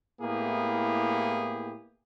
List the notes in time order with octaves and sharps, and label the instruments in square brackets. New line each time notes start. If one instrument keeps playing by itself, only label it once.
[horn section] A2 A#3 B3 E4 G4 G#4